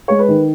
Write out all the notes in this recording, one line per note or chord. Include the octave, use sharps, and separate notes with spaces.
G#3 C#5
B4
D#3